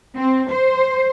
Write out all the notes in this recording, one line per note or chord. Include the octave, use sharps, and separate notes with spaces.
C4
C5